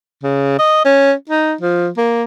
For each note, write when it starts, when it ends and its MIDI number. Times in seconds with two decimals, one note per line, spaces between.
0.24 0.55 49
0.59 0.83 75
0.85 1.13 61
1.30 1.54 63
1.61 1.89 53
1.97 2.24 58